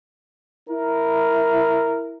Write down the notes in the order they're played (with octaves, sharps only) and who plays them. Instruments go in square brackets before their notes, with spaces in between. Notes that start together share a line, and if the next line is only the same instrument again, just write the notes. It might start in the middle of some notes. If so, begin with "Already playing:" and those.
[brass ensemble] E4 A#4